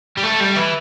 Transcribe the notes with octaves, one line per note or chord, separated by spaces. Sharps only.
G3
A3
G3
E3